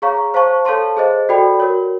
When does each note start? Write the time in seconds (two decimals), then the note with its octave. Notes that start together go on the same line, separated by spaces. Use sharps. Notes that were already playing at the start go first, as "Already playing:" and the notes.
0.02 G#4 C#5 F5 A#5 C#6
0.34 C5 F5 A5 C#6
0.65 A4 C#5 F5 A5 C6
0.97 G#4 C5 D#5
1.29 F#4 A4 D5 G5 B5
1.60 F#4 A#4 C#5